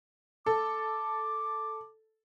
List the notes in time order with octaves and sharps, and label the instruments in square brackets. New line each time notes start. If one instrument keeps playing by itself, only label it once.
[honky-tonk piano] A4 [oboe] D6